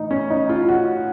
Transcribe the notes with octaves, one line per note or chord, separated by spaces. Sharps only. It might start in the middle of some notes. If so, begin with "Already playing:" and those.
Already playing: A2 E3 D#4
C#4
D#4
F4
F#4